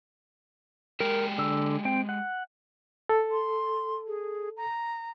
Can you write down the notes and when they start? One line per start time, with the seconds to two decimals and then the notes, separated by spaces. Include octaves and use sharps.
1.00 G#3 G4 A#4
1.38 D3 E6
1.85 C4 G5
2.09 F#5
3.09 A4
3.31 C6
4.07 G#4
4.57 A#5